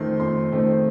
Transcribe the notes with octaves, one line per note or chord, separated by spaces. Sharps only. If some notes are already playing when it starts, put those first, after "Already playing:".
Already playing: F2 D#3 A3 C4 C6
F2 C6
D#3 A3 C4